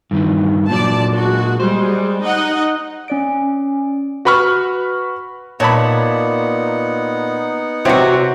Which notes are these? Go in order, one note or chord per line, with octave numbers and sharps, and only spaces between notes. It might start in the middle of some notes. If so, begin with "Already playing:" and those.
G2 D#3 E3
A#2 F#3 D5 A5
G#3 F#4
G3 G#3 C5
D#4 D#5 F#5
C#4 D5 D7
F#4 B4 B5 C#6 F6
A#2 B3 D#4 C#5 F#5 A5 B5
C3 E3 F#3 C4 F#4